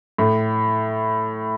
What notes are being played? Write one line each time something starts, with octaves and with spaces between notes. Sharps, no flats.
A2